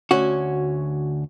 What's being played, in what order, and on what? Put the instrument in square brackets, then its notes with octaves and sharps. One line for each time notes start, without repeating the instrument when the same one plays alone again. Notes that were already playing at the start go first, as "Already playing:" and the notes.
[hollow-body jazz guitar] D2 C#4 F#4